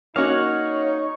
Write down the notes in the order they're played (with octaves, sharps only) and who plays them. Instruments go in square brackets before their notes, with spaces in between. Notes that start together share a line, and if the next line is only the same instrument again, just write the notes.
[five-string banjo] A#3 C#4 F#4 [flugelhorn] D#4 [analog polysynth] C#5 C#6 [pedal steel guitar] F5 F#5